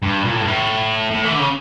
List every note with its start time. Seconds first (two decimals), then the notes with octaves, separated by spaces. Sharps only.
0.03 G2
0.25 A#2
0.33 A2
0.41 G2
0.48 A2
1.11 A2
1.25 E3
1.32 D3
1.40 C#3